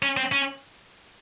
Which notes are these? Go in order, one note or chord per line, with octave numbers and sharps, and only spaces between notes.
C#4
C4
C#4